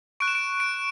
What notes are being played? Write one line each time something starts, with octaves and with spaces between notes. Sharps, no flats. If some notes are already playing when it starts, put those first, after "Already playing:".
C#6 F#6 D7
E7
D7
D7